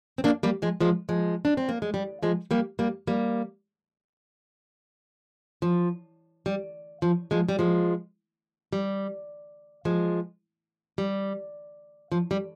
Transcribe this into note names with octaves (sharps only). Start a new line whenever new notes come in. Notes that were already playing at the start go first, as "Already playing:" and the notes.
C4
A#3 D4
G3 A#3
F3 G#3
F3 G#3
F3 G#3
D4
C4
A#3
G#3
G3
F3 G#3
G3 A#3
G3 A#3
G3 A#3
F3
G3
F3
F3 G#3
G3
F3 G#3
G3
F3 G#3
G3
F3
G3